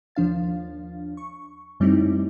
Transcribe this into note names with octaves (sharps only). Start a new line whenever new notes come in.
D#2 F3 D4 F5 A6
C#6
F#2 G3 A3 C4 D#4 E4